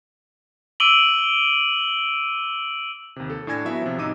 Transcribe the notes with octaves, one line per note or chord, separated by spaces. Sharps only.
D6 E6 D7 D#7 F#7 G7
D#2 C3
A4
A2 D4 G#5 G#6 A#6
F#3 B3 E4 F#4 E5
C3 F3
A1 C3 D#4 D6 E6 D#7